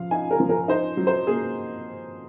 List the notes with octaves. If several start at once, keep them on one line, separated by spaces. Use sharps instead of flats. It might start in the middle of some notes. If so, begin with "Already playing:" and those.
Already playing: F3 F5
D#4 G#5
A#4
F3
A#4
D#4 C5
F#3
C5
A#3 G#4